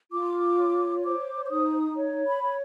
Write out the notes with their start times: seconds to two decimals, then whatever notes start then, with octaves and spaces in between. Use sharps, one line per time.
0.12 F4 D6
0.59 C#5
1.05 C5 D6
1.46 D6
1.51 D#4 D#6
1.97 C#5
2.27 B5
2.42 C#5